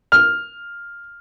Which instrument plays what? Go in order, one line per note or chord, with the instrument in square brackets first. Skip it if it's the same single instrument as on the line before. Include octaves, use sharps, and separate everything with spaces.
[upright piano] F6